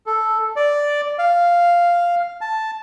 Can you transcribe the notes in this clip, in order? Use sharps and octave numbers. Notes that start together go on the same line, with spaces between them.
A4
D5
F5
A5